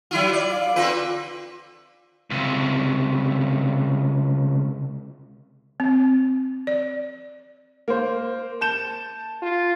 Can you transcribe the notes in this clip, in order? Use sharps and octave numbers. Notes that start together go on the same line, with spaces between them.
F#3 E4 F4
D5
F5
D3 C4 F4 B4
C#2 C3
C4
D5
A#3 C5
A5 G6 E7
F4